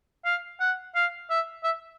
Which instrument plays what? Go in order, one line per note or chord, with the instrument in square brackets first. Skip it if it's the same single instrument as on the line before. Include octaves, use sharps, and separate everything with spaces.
[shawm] F5
F#5
F5
E5
E5